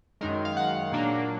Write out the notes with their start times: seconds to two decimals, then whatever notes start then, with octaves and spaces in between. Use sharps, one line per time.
0.21 F#2 D#3 G#3 A#4
0.45 F5
0.57 F#5
0.92 A#2 F#3 A#3 D4